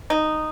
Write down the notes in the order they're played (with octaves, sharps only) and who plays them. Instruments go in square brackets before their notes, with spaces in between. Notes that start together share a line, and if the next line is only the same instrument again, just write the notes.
[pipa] D#4